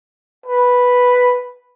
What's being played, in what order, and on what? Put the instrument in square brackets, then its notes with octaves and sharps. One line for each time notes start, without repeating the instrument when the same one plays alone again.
[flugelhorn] B4